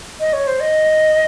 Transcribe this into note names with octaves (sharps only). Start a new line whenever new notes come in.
D#5
C#5
C5
D#5